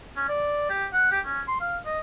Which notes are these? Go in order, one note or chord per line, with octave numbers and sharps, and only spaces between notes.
C#4
D5
G4
F#5
G4
C#4
C6
F5
D#5